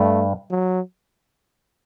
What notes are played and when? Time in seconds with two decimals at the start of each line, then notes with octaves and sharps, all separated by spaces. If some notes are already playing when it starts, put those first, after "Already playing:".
Already playing: G2 A3
0.50 F#3